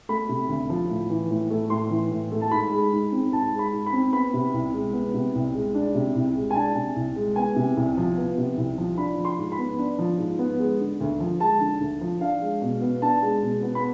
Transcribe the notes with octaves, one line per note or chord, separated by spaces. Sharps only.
A3 B5
C3
D2
F3
A2
E3
A2
A3
A2 C6
E3
A2
A3
A5
G#2 B5
G#3
G#2
C4
G#2 A5
G#3
B5
G#2
B5
C4
B3 B5
C3
C2
G#3
B3
C3
C2
G#3
D4
C3
C2
G#3
G#5
D4 A5
C3
C2
G#3
B3 G#5
C3
C2
F3
B3
C3
C2
F3
D4 B5
F3
C6
G#2
B5
B3
D4
F3
G#2
B3
G#3
D3
D2
F3
G#3 A5
D3
D2
F3
D4 F5
G#3
B2
B3
D4 A5
G#3
B2
B3
B5